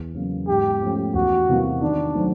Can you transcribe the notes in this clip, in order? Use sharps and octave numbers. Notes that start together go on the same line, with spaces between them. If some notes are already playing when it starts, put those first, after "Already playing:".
Already playing: E2
C#3 F#3 A#3
G#2 G4
F3 A3 C#4
E2 F#4
C3 E3 G3 A#3
D#3 D4
F#3 A3 C4 D#4